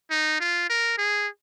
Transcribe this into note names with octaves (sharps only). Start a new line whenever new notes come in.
D#4
F4
A#4
G#4